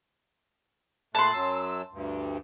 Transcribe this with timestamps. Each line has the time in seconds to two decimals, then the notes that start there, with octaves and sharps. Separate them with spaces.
1.15 A#2 A3 A5 C6 F#6
1.34 F#2 F#3 E6
1.92 D2 G2